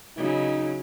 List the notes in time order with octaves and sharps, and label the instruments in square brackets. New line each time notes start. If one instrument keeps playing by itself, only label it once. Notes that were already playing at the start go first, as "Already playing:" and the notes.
[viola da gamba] C#3 F#3 E4 [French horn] D#4